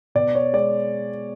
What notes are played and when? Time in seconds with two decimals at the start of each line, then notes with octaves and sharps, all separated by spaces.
0.15 B2 D5
0.35 C#5
0.53 G#3 D5